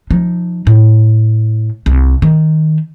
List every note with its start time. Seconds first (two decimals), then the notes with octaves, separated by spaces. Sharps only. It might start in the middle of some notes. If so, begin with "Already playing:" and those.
0.11 F3 D#4
0.67 A2
1.86 C2
2.22 D#3